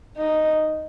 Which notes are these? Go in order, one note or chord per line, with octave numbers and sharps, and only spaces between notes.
D#4